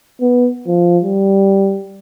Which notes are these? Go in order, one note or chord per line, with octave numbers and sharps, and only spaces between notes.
B3
F3
G3